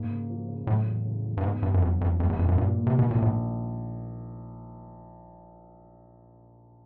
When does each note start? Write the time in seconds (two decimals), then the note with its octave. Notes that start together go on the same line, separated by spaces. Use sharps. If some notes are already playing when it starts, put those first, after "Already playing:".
Already playing: G#2 A#3
0.11 C#3
0.29 F3
0.48 C#3
0.67 A2 F#3
0.86 E2
1.05 C#3
1.24 E2
1.37 G2
1.43 G#2 B3
1.63 G2 D3
1.74 F#2
1.82 F2 F#3
2.00 F2 E4
2.20 F2 G3
2.29 E2
2.39 A#1 F2
2.48 F#2
2.58 G2 A#2
2.78 A#3
2.87 C3
2.96 B2 D#3
3.11 A#1 A#2
3.22 A2